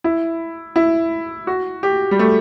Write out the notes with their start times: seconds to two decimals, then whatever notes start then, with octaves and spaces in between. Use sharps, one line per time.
0.04 E4
0.76 E4
1.47 F#4
1.83 G4
2.11 G3
2.19 A3